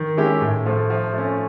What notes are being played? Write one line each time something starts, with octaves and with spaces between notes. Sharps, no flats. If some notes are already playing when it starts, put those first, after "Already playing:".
Already playing: D#3
G#3 C#4 E4 G4
A2
F3 A3
F3
A3
C#4